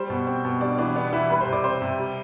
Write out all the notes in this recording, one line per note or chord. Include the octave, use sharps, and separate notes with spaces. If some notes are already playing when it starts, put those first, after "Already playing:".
Already playing: G3 C5
B2
C4
B2
G3 D4 D5
E3 D4 D5
B3 D4 D5
E3 E4 E5
G3 B4 B5
C5 C6
C3
D5 D6
C4 C5 C6
C3
G3